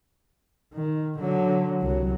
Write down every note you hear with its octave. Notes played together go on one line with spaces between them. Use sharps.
D#3
D3 F#3
C2 F#3